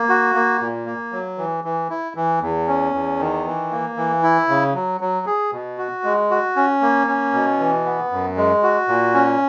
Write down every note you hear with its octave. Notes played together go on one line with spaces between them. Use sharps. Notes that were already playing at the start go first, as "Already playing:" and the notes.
Already playing: A#3
F#4
A#3
A#2
A#3
F#3
E3
E3
E4
E3
E2
C#4
E2
D#3
E3
A#3
E3
E4
C#3
F#3
F#3
G#4
B2
F#4
G#3
F#4
C#4
A#3
C#4
B2
E3
B3
F#2
G#3
F#4
A#2
C#4